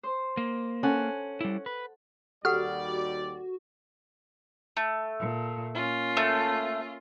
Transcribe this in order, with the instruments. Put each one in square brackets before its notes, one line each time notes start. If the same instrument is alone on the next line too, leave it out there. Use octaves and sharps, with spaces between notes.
[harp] C5
[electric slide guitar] A#3
[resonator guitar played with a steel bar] C#4 [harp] A4 F#5
[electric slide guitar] G3 E4
B4
[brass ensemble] D#2 G3 D5 [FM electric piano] F#4 [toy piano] G4 A4 F#5 [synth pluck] F6
[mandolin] A3
[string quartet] A#2
A#3 C#4 F4
[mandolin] A3